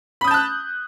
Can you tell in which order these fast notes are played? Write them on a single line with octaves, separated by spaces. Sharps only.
B5 D#6 G6 A5 F#6